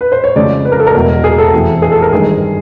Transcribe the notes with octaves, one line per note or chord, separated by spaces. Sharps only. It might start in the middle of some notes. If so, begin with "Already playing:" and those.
B4
C5
C#5
F2 C#3 F3 G#3 D5
B4
A#4
A4
A#4
E1 E2 B2
G#4
A4
F2 C3 E3
G#4
A4
A#4
G#1 G2 D#3 G#3 G#4